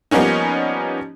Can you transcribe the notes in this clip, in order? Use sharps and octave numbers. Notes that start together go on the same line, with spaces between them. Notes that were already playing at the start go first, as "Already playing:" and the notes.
F3 G3 A#3 B3 C#4 D#4